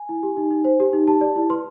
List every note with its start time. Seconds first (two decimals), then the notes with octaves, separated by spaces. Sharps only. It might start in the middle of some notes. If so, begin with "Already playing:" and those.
Already playing: G#5
0.09 E4
0.23 G4
0.37 D#4
0.51 D#4
0.64 C5
0.80 G4
0.93 D#4
1.07 G4 A5
1.21 D5
1.36 E4
1.50 B4 C6